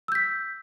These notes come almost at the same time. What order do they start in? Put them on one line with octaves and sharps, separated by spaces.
E6 G6 B6